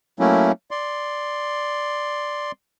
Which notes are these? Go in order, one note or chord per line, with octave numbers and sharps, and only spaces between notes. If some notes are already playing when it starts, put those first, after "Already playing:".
F#3 A3 A#3 C#4 E4
D5 C6